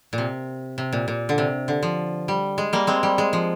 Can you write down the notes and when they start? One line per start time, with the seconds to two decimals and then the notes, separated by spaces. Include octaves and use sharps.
0.13 A#2
0.18 C3
0.78 C3
0.93 A#2
1.08 A#2
1.29 D3
1.38 C3
1.68 D3
1.83 F3
2.28 G3
2.58 G#3
2.73 G3 A#3
2.87 G#3 C4
3.03 G3
3.18 G#3
3.33 F3